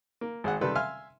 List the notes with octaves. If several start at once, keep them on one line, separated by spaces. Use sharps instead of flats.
A#3
G#1 G#4 F#5
C3 D#3 G3 A4 B4
E5 F5 G#5 C6 F6